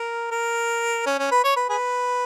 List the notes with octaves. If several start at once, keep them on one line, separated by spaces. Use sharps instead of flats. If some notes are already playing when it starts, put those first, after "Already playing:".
Already playing: A#4
A#4
C#4
C#4
B4
C#5
B4
G#4 B4